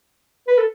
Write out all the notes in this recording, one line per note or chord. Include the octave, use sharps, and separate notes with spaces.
B4
A4